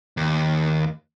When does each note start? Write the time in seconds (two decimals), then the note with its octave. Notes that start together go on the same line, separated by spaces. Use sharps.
0.17 D#2